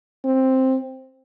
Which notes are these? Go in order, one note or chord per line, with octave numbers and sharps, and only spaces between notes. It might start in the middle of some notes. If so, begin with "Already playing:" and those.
C4